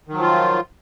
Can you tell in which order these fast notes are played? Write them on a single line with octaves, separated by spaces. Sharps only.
D#3 F#3 F3 F4